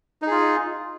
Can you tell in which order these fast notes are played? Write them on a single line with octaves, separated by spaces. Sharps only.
D#4 G#4 F4